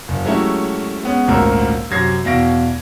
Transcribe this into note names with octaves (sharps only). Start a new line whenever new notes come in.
F#1
F#3 G#3 A3 C#4 E4 G4
G#3 B3 C#4
G#1 D2 A#2 C#4 A#4 E6
F#2 C3 G#6 A#6 C7
E2 B2 E4 F5 A#6 D7